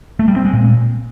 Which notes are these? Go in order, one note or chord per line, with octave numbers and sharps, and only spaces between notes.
A3
G3
C4
G#3
A#2